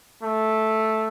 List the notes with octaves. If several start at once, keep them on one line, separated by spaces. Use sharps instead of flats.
A3